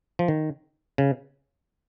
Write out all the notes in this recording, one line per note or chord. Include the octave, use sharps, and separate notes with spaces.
F3
D#3
C#3